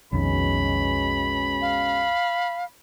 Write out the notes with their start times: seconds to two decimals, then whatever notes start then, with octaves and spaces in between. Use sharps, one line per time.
0.13 B1 F2 B2 D#3 G#3 C#4 B5
1.62 F5